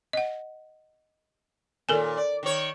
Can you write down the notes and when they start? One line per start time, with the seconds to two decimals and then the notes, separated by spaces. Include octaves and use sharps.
0.13 D#5 F#5
1.89 D#2 A#2 A4 A#4 G#5
2.17 D5
2.43 D#3 C#5